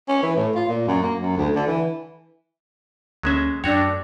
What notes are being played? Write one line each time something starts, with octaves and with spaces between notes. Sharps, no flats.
C#4
E3
A2
F4
A#2
F#2
A#3
F#2
D2
D3
E3
D2 F#3 G#3 A#3 C#4 E5
F#2 A3 D4 F#4 C#5 G5